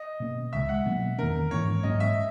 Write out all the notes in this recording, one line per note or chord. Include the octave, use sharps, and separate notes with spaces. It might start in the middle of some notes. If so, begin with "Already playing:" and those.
Already playing: D#5
B2 A#3 C#4
C#2 C#3 G#3 E5
F#5
B2 F#3 A#3 C#4
E2 D#3 A#3 C#4 A#4
G#2 E3 A#3 C#4 C#5
G#2 F#3 A#3 C#4 D#5
E5